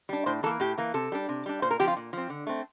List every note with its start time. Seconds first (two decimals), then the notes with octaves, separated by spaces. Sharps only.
0.09 G3 D4
0.26 A2 C5
0.43 E3 A4
0.46 A#3
0.60 A2 G4
0.78 E3 A#3
0.94 C3 A4
1.12 G3 D4
1.29 C3
1.46 G3 D4
1.62 A#2 C5
1.71 A#4
1.79 F3 C4 G4
1.88 F4
1.97 A#2
2.13 F3 C4
2.30 D3
2.47 A3 C4